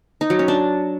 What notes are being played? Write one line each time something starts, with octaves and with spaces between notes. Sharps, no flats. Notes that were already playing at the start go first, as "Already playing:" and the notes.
D#4
F#3
C#4
D4